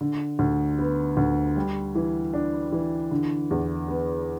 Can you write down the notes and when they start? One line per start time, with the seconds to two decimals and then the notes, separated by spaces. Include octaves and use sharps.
0.01 D3
0.39 D2
0.79 B3
1.17 D2
1.56 G3
1.95 E3
2.33 D4
2.72 E3
3.11 D3
3.51 E2
3.88 B3